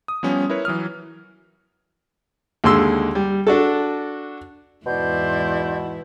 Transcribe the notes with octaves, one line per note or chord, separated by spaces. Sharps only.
D#6
F3 G3 B3 C#4
E4 A#4 B4 C#5
E3 F#3 D#6 F6
D#2 D3 G#3 C6 E6
G3
D4 F#4 A4
E2 G#2 B2 E4 D5 C6 G6